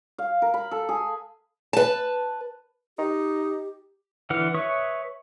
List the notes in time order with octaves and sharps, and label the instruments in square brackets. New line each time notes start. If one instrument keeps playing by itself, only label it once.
[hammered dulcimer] F5
A#4
B5
A4
G#4
[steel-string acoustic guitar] B4 A5
[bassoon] D#4 [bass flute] G4
[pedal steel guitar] D3 E3 B4 F#5 F6
B4 C#5 E5 C#6 D#6